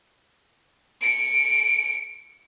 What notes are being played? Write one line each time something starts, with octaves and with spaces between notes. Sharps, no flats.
C#7 D7